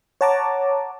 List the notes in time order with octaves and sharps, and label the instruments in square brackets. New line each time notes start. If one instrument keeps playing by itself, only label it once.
[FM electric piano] C#5 F#5 A5 A#5 D6